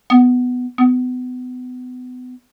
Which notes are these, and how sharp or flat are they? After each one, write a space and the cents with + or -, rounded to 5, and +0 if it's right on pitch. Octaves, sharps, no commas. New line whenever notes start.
B3 +10
B3 +30